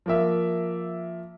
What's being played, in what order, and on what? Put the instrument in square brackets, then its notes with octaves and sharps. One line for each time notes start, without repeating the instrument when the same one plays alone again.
[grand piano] F3 A#3 E5